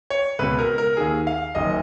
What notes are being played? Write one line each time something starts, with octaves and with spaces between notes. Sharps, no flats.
C#5
C#2 B2 B4
A#4
A#4
D#2 D#3 G#4
F5
F#1 F#2 D#3 D#5